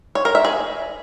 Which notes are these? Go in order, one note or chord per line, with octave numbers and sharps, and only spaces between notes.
C#5
A#4
E5
G#4